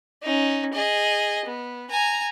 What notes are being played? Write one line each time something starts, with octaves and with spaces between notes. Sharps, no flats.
C#4 D#4
G#4 D#5
B3
G#5 A#5